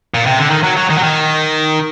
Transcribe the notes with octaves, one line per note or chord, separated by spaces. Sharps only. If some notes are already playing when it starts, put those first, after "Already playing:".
A#2
C3
D3
D#3
F#3
F#3
D#3
F#3
D#3